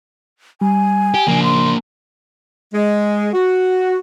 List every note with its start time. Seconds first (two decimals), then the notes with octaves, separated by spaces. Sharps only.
0.61 G3 G#5
1.14 G4
1.28 C#3 F3 A#3 D4
1.43 C6
2.73 G#3
3.33 F#4